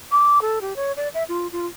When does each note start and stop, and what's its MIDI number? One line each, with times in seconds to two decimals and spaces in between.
0.11 0.41 86
0.41 0.59 69
0.61 0.76 67
0.76 0.92 73
0.97 1.08 74
1.14 1.24 76
1.29 1.48 65
1.52 1.67 65